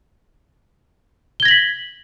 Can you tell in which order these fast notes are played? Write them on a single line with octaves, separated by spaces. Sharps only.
G7 G#6 A#6 F#7 B6